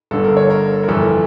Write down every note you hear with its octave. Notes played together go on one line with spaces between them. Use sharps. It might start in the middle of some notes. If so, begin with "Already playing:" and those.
G1 G2 D3 A4
A#4
C#5
A#4
A#4
G1 F2 E3 A4